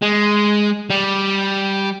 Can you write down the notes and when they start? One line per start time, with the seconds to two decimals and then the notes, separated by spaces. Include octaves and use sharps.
0.02 G#3
0.90 G3